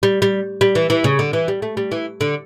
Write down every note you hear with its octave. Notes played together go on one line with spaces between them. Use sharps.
G3
G3
G3
E3
E3
C#3
D3
E3
G3
A3
G3
E3
D3